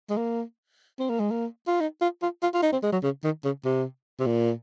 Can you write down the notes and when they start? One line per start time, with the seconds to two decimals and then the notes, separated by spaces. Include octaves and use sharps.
0.10 G#3
0.17 A#3
0.99 C4
1.10 A#3
1.20 G#3
1.31 A#3
1.67 F4
1.81 D#4
2.01 F4
2.22 F4
2.42 F4
2.54 F4
2.63 D#4
2.73 C4
2.83 G#3
2.93 F#3
3.03 C#3
3.24 D#3
3.44 C#3
3.65 C3
4.20 C3
4.26 A#2